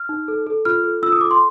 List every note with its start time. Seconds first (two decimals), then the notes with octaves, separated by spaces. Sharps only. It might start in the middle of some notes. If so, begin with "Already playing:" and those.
Already playing: F6
0.09 D#4
0.28 A4
0.47 A4
0.65 F4 F6
0.84 A4
1.02 F4 E6
1.12 D#6
1.21 A4 D6
1.31 C6